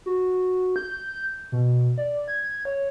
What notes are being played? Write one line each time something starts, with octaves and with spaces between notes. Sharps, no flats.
F#4
G6
B2
D5
G#6
C#5